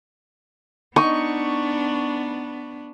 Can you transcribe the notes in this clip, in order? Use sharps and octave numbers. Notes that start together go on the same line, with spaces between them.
B3 D4 D#4 C#6